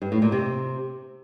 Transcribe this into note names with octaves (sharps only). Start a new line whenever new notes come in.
G2
A2
A#2
C3